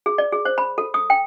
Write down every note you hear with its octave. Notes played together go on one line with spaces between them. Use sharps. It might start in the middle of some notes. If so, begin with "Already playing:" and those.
G#4
D5
G#4
C5
B5
A4
D#6
G5